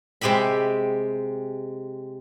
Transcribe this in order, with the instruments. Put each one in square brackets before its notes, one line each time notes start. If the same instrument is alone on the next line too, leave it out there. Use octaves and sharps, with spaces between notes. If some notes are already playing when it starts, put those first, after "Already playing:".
[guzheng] C3 G#3 G4 E5 B5